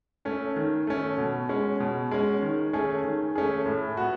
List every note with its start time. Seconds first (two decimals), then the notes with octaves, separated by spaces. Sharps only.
0.25 A3 C#4
0.56 D#3
0.87 A3 C#4
1.18 B2
1.49 G#3 C#4
1.80 B2
2.11 G#3 C#4
2.42 D#3
2.73 A3 C#4 G#4
3.04 D#3
3.36 A3 C#4 G#4
3.66 A2
3.97 B3 F#4